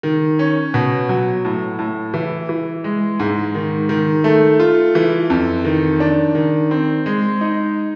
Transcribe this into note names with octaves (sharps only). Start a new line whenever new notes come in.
D#3
C#4
B2
F#3
A2
A2
E3
E3
G#3
G#2
D#3
D#3
A3
F4
E3
F2
D#3
D4
D#3
C4
G#3
D#4